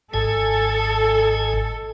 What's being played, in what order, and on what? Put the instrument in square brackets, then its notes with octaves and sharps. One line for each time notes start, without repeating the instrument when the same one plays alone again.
[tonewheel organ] G#1 G#2 G#5 [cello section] A4